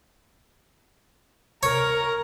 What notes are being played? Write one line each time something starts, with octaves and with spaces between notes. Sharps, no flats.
A#4 C#5 A#5